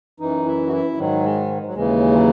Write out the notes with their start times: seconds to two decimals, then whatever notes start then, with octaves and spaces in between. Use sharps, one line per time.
0.20 F#2 E3 D#4
0.47 E4
0.67 F#4
0.72 E4
0.97 G#2 D#3 F#3
1.23 G#3
1.66 F#3
1.74 D#2 C#3 E3 G#3
2.13 F#3